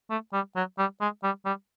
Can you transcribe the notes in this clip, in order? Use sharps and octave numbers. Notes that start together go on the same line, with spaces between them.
A3
G3
F#3
G3
G#3
G3
G3